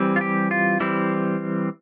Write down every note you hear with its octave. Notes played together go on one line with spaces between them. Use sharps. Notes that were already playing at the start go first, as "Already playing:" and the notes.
Already playing: E3 G3 C4
F4
G4
F4
E3 G3 C4 E4